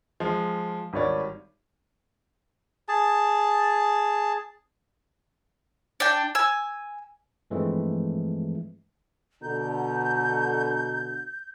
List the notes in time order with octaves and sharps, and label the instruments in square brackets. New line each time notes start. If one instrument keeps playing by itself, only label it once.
[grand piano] F3 G#3
G#1 G3 C#5 D5
[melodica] G#4 A5
[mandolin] D4 G5
G#5 E6
[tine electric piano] G2 E3 F3 G#3 A3 C4
[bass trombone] B2 [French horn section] D3 [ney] A#5 [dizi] G6